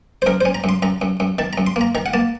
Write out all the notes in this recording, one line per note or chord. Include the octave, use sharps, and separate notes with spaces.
C5
F#2 A#4
C5
C#4
A#5
F#2 C6
F#2 A#5
F#2
F#2
D#3 A5
A#5
F#2
C6
A#3 A#5
D#3 A#5
F#5
A#3 A5